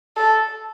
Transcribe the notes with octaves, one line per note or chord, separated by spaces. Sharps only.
A4